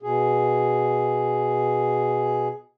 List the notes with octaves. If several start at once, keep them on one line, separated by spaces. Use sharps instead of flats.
B2 G#4